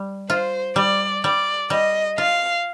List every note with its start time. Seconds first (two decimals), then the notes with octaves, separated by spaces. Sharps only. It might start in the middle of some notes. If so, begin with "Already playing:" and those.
Already playing: G3
0.29 F4 C5
0.76 G3 D5
1.23 G3 D5
1.70 G3 D#5
2.18 F4 F5